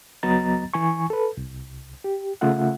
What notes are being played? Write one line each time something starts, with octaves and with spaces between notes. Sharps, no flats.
C#2 F#3 B3 D#5 A#5 A6
E3 G#5 C#6
A4 B4
C2
G4
C#3 A3 F4 E5 F#5